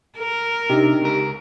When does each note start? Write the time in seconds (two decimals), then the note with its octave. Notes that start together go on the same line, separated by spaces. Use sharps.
0.18 A#4
0.69 C3 D4 D#4 G4
1.01 C#2 A#4